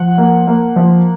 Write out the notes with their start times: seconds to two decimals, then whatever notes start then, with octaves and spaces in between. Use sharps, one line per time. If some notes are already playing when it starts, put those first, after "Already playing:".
Already playing: F3 F#5
0.18 A#3
0.47 A#3
0.76 F3